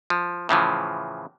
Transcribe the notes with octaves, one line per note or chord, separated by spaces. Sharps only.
F3
A2 C#3 E3 F3